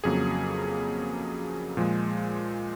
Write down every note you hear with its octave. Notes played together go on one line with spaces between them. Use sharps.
F2 C#3 F#3 A#3 G#4
A#2 F3 G#3